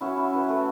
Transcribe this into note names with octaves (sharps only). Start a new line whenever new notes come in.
C#4 E4 F#4
E4
E3
A3